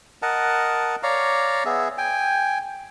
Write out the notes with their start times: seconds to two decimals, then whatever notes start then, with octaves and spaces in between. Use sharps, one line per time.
0.22 A#4 D#5 F#5 A5
1.03 C#5 D5 F5 A#5
1.66 B3 G#4 E5
1.98 G5 G#5